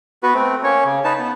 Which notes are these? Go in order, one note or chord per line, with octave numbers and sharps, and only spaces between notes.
B3 F#4 B4
A3 C4
A#3 C#4 C#5
C#3
D#4 B4 A5
B3